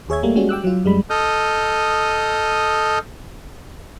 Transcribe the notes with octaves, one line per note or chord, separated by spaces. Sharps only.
D#2 G#4 C#5 E5 G#6
G3 A3 A#3
G3 G#3 C#4 F#4
G5 D6 E6 F#6
F#3 F4
F#2 G3 G#3 B5
A4 D#5 D#6 F6 G6